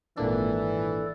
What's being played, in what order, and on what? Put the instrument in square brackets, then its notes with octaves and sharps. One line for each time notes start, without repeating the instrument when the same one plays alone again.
[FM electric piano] G#1 A#2 D4 [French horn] E3 [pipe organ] A4 D5